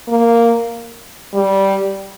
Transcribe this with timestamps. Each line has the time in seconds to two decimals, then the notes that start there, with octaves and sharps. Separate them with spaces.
0.08 A#3
1.34 G3